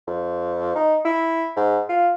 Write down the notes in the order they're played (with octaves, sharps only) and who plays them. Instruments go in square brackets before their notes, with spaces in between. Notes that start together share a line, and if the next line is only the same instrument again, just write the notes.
[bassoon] F2
D#4
E4
G#2
F4